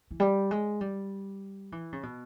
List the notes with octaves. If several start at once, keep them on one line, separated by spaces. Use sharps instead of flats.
E3
G3
G#3
G3
E3
C#3
B2